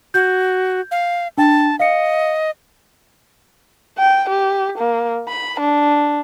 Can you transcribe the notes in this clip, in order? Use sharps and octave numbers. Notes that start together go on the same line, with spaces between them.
F#4 G6
F5
D4 G5 A5
D#5 F5 C#7
G5
G4
A#3
B5
D4